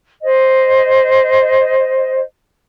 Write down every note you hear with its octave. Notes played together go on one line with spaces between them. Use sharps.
C5 D#5